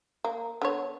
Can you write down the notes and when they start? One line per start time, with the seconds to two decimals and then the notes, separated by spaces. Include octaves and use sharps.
0.24 A#3
0.62 D3 B3 C#5